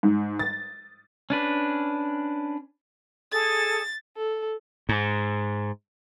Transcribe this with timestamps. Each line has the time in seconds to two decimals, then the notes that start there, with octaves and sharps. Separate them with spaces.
0.03 G#2
0.39 A6
1.30 C#4 D4 B4
3.32 G#4 A4 A6
4.17 A4
4.89 G#2